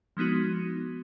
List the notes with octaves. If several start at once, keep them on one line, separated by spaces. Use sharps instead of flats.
F3 G#3 B3 D#4 F#4